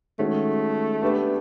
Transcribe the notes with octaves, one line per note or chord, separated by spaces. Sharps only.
D#3 G#3 A3 C#4 F#4
B3 D4 G4 B4 E5